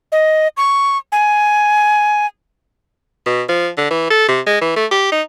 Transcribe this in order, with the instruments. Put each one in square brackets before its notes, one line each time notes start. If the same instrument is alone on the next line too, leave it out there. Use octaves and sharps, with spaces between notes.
[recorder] D#5
C#6
G#5
[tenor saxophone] B2
F3
D3
E3
A4
C3
G#3
E3
A3
G4
D#4